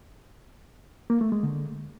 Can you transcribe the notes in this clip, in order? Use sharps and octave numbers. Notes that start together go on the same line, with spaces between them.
A#3
A3
G#3
D3